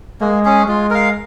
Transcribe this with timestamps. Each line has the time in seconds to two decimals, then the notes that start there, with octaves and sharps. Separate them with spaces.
0.21 G#3 A#3
0.45 C#4 G#4
0.67 G#3 F4
0.90 A#4 F5